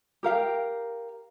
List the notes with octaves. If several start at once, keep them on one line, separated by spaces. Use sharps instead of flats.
G4 A#4 F5 G5